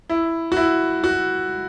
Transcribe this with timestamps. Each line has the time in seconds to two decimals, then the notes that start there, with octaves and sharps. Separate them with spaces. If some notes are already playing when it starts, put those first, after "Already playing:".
0.09 E4
0.52 F#4
0.57 E4
1.04 F#4